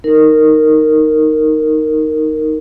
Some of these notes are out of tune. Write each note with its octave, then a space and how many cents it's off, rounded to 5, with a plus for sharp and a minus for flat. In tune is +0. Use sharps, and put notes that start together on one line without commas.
D#4 +0 A#4 -10